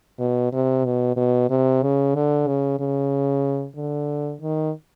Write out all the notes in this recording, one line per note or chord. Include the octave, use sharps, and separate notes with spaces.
B2
C3
B2
B2
C3
C#3
D3
C#3
C#3
D3
D#3